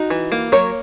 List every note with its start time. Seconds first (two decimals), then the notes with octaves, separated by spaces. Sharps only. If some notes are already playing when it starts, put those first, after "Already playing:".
Already playing: D#4 F#4
0.10 E3
0.32 A#3
0.52 F#3 A#4 C#5